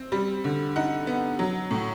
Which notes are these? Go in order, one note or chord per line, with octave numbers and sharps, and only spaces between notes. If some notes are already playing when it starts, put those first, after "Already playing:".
Already playing: C4
G3
D3
D#4 F#5
B3
F#3
A2